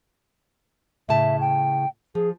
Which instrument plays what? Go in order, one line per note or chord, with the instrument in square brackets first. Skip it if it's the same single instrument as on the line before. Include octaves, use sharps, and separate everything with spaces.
[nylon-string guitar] A2 C#3 A5 [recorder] E5
[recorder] G5
[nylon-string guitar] F3 [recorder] G#4